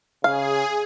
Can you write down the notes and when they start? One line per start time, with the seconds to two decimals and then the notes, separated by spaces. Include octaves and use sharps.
0.24 C#3 G#4 F5